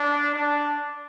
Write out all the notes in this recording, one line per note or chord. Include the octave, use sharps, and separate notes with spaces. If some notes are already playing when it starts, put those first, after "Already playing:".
Already playing: D4
D4